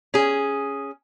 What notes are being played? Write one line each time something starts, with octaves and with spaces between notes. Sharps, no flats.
C#4 G#4